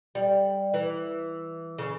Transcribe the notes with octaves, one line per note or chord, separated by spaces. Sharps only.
G3
E3
C#3